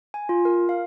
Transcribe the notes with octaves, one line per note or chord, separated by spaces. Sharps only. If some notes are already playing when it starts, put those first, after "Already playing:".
G#5
F4
A#4
F5